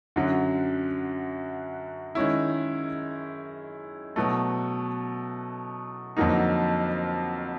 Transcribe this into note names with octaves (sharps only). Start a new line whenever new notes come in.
F#2 D3 F#3
D#3 G#3 C#4 E4
B2 F#3 A3
F2 D3 F#3 A#3 D#4